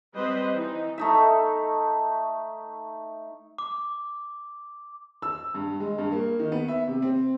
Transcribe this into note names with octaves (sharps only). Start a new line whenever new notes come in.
G3 C4 B4 C5 D#5
E3 D#4
A3 D#4 E5
D6
E6
G2
G#3
G2
A#3
D#3
B3
E5
C3
C4